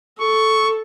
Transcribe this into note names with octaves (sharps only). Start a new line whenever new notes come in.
A4 C#6